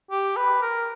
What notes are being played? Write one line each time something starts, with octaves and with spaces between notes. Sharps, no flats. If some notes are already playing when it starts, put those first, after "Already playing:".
G4
B4
A#4